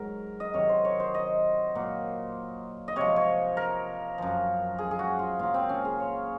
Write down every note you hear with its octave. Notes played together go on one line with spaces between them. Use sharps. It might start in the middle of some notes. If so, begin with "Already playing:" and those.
Already playing: G#2 F#3 A#4
D#5
C3 D#3 F#3 C#5
C5
C#5
C5
D#5
A#2 F#3
D#5
C3 F3 C#5
C#5
A#4
F#2 F3
G#4
G#4
F#4
F4
A#2 F#3 F4
C4
C#4
G#4
C#5